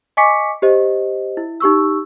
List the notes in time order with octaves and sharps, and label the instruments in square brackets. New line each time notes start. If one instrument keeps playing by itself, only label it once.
[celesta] D#5 G#5 C#6 D6 B6 C#7
G4 C5 D#5
E4
D#4 G4 C#6 E6